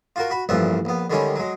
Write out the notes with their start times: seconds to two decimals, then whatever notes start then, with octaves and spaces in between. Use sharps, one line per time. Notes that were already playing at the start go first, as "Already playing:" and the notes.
0.16 F4 F#4 A#4
0.30 F#4 B5
0.49 A1 G2 A#2 F3 E5 F#5
0.85 A#1 B3
1.10 D3 D#3 G3 G#3 C#4
1.36 F#3 G#3